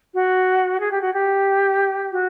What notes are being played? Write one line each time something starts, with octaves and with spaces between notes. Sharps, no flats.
F#4
G#4
G4
F#4
G4
F#4